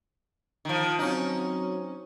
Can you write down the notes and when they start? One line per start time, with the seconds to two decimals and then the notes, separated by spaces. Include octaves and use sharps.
0.65 D#3 F3
0.99 F#3 C4 C#4 D#4